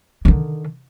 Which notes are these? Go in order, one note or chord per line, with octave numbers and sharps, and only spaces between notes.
D3 D#3